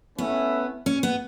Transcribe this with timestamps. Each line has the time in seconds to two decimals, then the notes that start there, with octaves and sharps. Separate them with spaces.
0.18 A3 B3 C#4 E4 B4 E5
0.86 C#4
1.03 B3